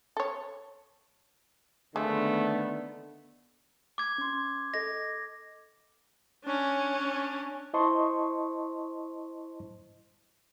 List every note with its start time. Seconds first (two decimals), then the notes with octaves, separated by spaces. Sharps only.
0.17 A4 C#5
1.96 D3 D#3 F3 G#3 A3 B3
3.98 D6 G#6
4.18 C#4 C6
4.74 A4 D#5 A#6
6.45 C#4 D4
7.74 E4 C5 D#5 A5 C6 C#6